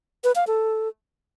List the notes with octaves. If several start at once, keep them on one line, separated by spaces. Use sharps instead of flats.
B4
F5
A4